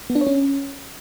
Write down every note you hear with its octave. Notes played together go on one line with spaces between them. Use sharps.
B3
D4
C#5
C#4